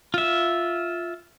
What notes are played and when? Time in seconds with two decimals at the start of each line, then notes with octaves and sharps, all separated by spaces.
0.14 F4 E5